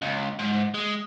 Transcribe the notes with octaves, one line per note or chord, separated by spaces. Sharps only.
C#2
G#2
G#3